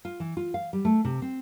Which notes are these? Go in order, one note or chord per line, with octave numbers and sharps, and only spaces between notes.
F4
E3
F4
F5
G3
A3
C3
C4